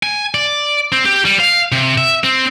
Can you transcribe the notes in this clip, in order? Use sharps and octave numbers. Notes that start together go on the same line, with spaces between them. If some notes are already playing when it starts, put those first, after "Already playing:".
G#5
D5
C4
G4
G3
F5
C3
E5
C4